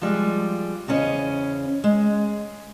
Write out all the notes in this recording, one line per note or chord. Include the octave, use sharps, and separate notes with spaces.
F3 G3 G#3
E2 C#3 B3 C#4 C5 D#5
G#3